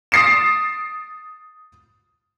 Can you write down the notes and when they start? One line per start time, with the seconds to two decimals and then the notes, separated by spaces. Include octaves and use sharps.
0.12 D#6 A6 C7 D7 E7